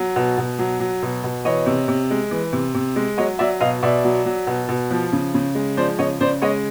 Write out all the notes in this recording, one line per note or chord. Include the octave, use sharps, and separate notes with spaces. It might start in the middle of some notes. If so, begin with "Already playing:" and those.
Already playing: F#3
B2
B2
F#3
F#3
B2
B2
E3 C#5 D#5
C3
C3
G#3
E3
C3
C3
G#3
F#3 C#5 D#5
F#3 D5 E5
B2 D#5 F5
B2 D5 E5
F#3
F#3
B2
B2
F3
C#3
C#3
G#3
F3 C5 D5
C#3 C#5 D#5
C#3 C5 D5
G#3 C#5 D#5